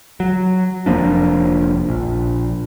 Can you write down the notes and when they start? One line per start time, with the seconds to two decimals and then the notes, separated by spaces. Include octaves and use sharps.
0.20 F#3
0.86 F1 F3 A#3 D4
1.89 A#1